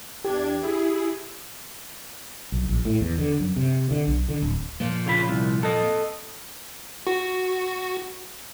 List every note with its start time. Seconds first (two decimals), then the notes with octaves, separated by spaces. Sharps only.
0.25 E2 D4 G4 G#6
0.62 E4 G#4
2.52 B1
2.69 A#1
2.85 A2
3.01 E2
3.18 D3
3.40 F#2
3.56 C3
3.91 D3
4.07 B1
4.29 D3
4.42 D1
4.80 A#2 F3
5.06 C#3 F4 B5
5.28 C2
5.63 A4 D#5
7.07 F#4